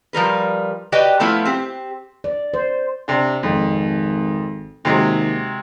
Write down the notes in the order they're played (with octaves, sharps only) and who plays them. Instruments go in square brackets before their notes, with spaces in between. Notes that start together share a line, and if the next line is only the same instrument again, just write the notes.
[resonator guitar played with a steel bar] F3 G3 A#4 B4
F#4 G4 B4 D5 D#5 G5
F3 A3 B3 E4 F4
C4 G4
[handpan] D5
C5
[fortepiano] C3 D4
[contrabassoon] G#1 [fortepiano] F2
[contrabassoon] D#2 [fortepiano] C3 F#3 G#3